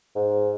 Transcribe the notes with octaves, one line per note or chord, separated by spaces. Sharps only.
G#2